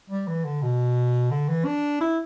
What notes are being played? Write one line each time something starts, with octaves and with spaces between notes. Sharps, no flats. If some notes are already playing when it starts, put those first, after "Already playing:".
G3
E3
D3
B2
D3
E3
D4
E4